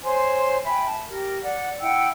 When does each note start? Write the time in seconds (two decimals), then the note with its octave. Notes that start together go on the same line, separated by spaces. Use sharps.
0.03 C5 C#5 G#5 C6
0.65 E5 G5 G#5 B5
0.86 A5
1.08 G4 A#4
1.42 D5 F#5
1.80 E4 F#5 G5 E6